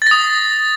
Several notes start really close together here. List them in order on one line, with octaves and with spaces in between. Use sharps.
A6 A#6 D#6